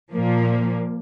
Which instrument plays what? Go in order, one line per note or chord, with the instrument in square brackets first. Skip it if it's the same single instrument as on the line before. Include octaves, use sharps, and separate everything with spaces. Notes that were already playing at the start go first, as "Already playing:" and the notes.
[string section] A#2 F3 A#3